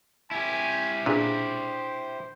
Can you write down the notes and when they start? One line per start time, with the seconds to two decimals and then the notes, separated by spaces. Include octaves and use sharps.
0.31 E4 G4 G#5
1.06 A#2 D4 G#4 B4 C5